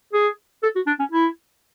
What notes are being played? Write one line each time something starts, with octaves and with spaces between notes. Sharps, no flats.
G#4
A4
F#4
D4
C#4
E4